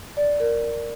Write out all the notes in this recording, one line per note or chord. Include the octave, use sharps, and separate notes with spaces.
D5
A#4